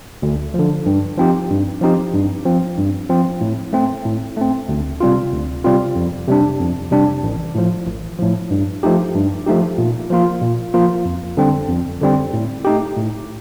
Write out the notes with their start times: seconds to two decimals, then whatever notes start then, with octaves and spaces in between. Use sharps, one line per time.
0.22 D2
0.54 D3 F3
0.86 G2
1.18 F3 C4 D#4 G4
1.50 G2
1.81 F3 C4 D#4 G4
2.14 G2
2.45 F3 C4
2.77 G2
3.09 F3 C4
3.41 A2
3.73 A3 C4
4.05 A2
4.37 A3 C4
4.69 D2
5.00 C3 G3 C4 F4
5.32 D2
5.64 C3 G3 C4 F4
5.96 F2
6.28 C3 G3 D4
6.59 F2
6.91 C3 G3 D4
7.23 A1
7.55 A2 F3
7.87 A1
8.18 A2 F3
8.50 G2
8.83 F3 A3 D#4 G4
9.14 G2
9.46 F3 A3 D#4 G4
9.78 A#2
10.10 F3 A#3 F4
10.41 A#2
10.74 F3 A#3 F4
11.05 F2
11.37 D3 G3 C4
11.69 F2
12.01 D3 G3 C4
12.33 A2
12.65 A3 D#4 G4
12.97 A2